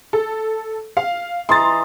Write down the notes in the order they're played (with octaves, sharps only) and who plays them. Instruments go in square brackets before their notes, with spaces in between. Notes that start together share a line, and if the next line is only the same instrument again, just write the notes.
[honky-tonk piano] A4
F5
[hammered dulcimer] E3 D#5 A#5 [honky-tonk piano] C6 A6